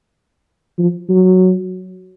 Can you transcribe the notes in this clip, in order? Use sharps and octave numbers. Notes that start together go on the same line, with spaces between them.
F3
F#3